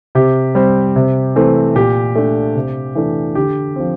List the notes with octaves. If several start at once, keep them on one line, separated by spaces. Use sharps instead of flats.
C3 G4
G3 C4
C3
E3 A3 C4
A#2 G4
A3 D4
C3
E3 A3 D4
D3 G4
F3 C4